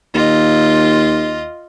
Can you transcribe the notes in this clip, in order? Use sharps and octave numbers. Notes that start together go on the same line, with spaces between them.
D#2 F4 D#5